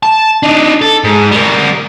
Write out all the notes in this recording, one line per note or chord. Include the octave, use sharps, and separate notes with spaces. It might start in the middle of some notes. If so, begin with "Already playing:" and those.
A5
D4 D#4
A4
G#2
G3 A#4